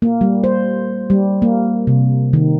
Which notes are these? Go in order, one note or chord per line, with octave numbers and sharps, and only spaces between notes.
A#3
G3
C5
G3
A#3
C3
D#3